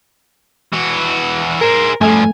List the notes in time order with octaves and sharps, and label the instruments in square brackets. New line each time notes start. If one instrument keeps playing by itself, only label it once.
[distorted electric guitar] E3 F#4
[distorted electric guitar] G#4 C5 [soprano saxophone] A#4
[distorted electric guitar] G2 F3 [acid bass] A3 [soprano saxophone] G#5